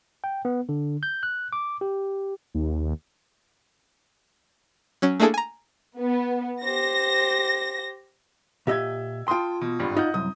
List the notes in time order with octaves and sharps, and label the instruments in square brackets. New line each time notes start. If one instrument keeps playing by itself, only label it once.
[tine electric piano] G5
B3
D3
G6
F#6
D6
G4
[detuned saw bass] D#2
[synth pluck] F#3 C#4
A3 A#3 D4 E4 G#4 A4
G#5 A#5
[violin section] B3
[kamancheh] G4 C5 [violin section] A#6
[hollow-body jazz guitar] A#2 G4 D#5 [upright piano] E5 E6 G#6
[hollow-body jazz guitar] F4 C6 [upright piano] G5 A5 D#6
[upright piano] B2
G#1 G2
[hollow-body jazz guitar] D#4 F4 [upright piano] D#5 F#5 G6
[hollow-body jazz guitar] C2 F#2 [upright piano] D#6